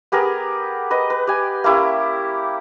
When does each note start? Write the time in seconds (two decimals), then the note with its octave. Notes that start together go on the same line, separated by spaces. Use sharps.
0.12 B3 G4 G#4 A#4
0.91 B4 D#5
1.10 B4
1.27 G4 G#5
1.64 A#3 C#4 E4 G4